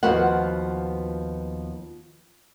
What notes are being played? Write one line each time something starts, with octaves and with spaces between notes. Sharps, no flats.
D#2 F3 B3 F#4 C5 F#5